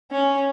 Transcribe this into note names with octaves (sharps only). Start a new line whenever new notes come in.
C#4